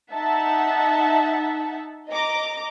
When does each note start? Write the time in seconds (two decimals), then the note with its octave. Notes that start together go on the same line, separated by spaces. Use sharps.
0.13 D#4 E5 F#5 A5
2.09 D#5 A#5 D6